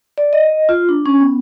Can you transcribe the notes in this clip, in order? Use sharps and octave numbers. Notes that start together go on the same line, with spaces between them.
D5
D#5
F4
D4
C#4
B3